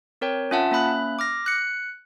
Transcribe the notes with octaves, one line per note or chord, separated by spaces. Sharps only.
C4 A#4 C#5 G5
C#4 F4 E5 F#5 A5
A#3 C#4 E5 B5 F#6
D6 F6 A#6
F#6 C#7